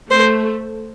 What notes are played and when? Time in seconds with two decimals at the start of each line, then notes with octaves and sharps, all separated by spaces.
0.11 A3 C5